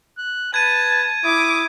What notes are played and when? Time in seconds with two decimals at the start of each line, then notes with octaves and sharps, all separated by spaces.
0.18 F#6
0.54 B4 A5 G#6 D#7
1.25 E4 D6 D#6